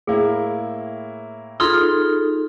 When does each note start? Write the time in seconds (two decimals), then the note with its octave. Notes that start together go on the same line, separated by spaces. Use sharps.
0.07 A2 A#3 E4 G#4
1.60 D#4 F4 G#4 A4 C6 D#6 F6